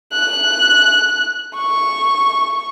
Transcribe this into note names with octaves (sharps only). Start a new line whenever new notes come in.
F#6
C#6